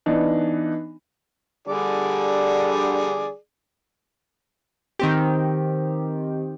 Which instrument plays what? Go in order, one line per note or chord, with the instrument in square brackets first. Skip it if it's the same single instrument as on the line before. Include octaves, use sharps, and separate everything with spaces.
[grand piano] E3 B3 D4 D#4
[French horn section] D3 G3 [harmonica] G#4 D5
[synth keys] D#3 C4 G4